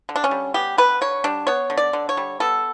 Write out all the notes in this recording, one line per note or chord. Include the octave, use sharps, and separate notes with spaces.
D3
D4
C#4
G3
B3 G4
D3 B4
D3 C#5
G3 D4
B3 C#5
D3
D5
D3
C#5
G3
B3 A4